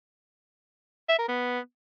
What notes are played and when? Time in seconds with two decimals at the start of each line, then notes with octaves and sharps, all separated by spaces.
1.09 E5
1.19 A#4
1.29 B3